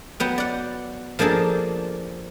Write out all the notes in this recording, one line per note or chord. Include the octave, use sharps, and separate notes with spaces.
F#3 B3 G5
D5 F#5
F3 A#3 D4 G#4 A4